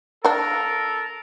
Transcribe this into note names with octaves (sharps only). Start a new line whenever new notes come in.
A#3 D4 A4 A#4